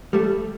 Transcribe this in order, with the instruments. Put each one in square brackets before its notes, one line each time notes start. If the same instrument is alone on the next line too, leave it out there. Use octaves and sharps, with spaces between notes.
[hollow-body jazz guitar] G3 A3